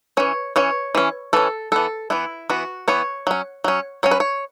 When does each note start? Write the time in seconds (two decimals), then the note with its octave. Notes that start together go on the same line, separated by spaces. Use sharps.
0.17 E3 C#4 C#5
0.56 E3 C#4 C#5
0.95 E3 C#4
1.33 E3 C#4 A4
1.72 E3 B3 A4
2.10 E3 B3 E4
2.50 E3 B3 F#4
2.88 E3 B3 C#5
3.27 F#3 C#4
3.64 F#3 C#4
4.03 F#3 C#4 C#5
4.11 B4
4.20 C#5